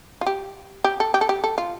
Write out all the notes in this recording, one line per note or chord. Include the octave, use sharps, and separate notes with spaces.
F4
G4
G4
A4
G4
A4
G4
A4
F4